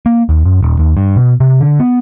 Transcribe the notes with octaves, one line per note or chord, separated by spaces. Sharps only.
A#3
D#2
F#2
D#1
D#2
G2
B2
C3
D3
B3